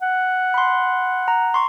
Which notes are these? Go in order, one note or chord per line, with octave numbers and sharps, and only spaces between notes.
F#5
B5 C6
A#5
C6 C#6